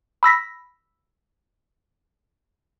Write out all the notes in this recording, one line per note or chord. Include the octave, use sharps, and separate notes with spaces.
B5 E6 A#6 B6